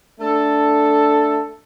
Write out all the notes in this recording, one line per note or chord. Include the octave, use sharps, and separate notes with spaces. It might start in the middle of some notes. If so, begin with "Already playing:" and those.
A3 D4 A4